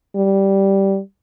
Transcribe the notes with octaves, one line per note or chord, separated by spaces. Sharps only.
G3